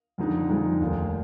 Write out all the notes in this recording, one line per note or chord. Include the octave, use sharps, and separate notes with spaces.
F2 D3 G#3 D#4
F2 D3 G#3 D#4
F1 D#2 D#3